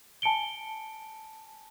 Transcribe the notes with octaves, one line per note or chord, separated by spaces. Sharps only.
G#5 A5 C#7 D7 G7